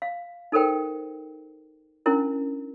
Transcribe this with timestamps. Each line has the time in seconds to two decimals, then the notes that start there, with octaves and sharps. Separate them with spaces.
0.02 F5
0.52 D#4 A4 A#4 C5 G5
2.06 C#4 D4 E4 A#4